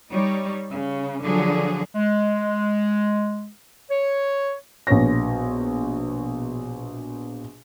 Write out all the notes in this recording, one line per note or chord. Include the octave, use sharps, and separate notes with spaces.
G3 D#4 C#5
C#3
D3 F3 F#3 G#4
G#3
C#5
A#1 B2 B4 C#5 A#6